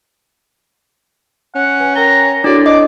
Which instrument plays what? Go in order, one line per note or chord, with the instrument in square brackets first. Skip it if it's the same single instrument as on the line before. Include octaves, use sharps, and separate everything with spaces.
[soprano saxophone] C#4 [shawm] F#5
[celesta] B4 G#5
[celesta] A#4 G5 G7 [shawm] A#5
[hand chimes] D4 F#4 [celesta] E4 A4 C#5 [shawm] D5
[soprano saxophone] D5 [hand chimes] D#5 [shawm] D6